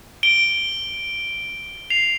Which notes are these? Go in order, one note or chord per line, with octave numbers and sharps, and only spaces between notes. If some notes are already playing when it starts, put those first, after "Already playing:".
D7 G7
C7 F7